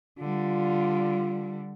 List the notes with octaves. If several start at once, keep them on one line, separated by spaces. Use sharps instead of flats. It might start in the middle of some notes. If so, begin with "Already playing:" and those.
D3 G3 F4